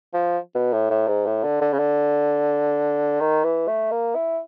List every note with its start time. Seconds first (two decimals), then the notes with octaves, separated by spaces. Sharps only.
0.13 F3
0.55 B2
0.73 A2
0.90 A2
1.08 G#2
1.26 A2
1.44 D3
1.61 D3
1.73 C#3
1.79 D3
3.20 D#3
3.44 E3
3.68 A3
3.91 A#3
4.15 E4